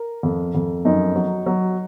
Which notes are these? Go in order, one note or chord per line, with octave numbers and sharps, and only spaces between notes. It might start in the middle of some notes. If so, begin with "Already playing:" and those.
Already playing: A#4
F2
F2
F#2 D#4
F#3
F#3